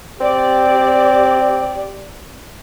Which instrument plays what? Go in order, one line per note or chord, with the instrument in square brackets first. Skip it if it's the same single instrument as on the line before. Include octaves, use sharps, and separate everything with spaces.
[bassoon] C4 [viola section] G4 D5